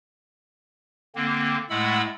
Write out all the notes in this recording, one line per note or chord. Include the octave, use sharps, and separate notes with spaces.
D3 A#3 C4
A2 G#3 A3 F#5 B5 E6